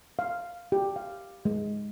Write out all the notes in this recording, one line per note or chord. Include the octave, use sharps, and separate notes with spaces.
F5
G4
F5
G#3